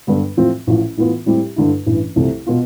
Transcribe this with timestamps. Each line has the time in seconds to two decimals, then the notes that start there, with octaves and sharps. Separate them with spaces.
0.07 G2 D3 G3 B3
0.37 A2 F3 C4 F4
0.67 A1 A2 F3
0.97 A2 E3 B3 F4
1.26 A2 G3 C4 E4 G4
1.56 G2 D3 A3 E4
1.86 A1 G2 E3
2.16 C2 C3 F3 A3
2.47 B2 B3 F4